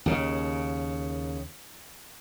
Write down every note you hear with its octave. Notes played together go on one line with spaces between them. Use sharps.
D#2 C#3